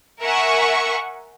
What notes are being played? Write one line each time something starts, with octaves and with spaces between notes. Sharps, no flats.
A#4 E5 F#5 G#5 C#6